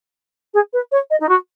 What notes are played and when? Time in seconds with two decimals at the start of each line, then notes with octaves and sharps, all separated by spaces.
0.54 G#4
0.73 B4
0.91 C#5
1.10 D#5
1.20 D#4
1.29 F#4